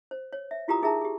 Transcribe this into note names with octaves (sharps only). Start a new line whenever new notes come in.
C5
C#5
E5
E4 F4 G4 A#4 A#5 D#6
D#4 G#4 A#4 E5 A5 A#5
G4 G#4